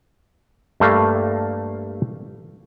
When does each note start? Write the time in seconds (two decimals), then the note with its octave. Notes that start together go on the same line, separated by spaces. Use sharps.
0.80 G2 A3 A#3 F5